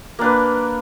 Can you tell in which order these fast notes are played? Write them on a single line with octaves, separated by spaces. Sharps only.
A#3 D4 B4